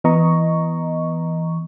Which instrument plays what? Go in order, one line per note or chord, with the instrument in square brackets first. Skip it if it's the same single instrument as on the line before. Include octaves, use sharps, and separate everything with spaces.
[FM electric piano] E3 B3 D#5 A#5 C#6